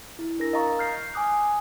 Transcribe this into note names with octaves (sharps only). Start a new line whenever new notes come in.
E4
D4 A#4 A#6
D#5 F5 A#5 C#6
F6 G6 C7
G#5 D6 D#6 F#6